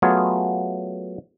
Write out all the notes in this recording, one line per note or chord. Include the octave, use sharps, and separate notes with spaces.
F#3 A3 B3 F4 G#4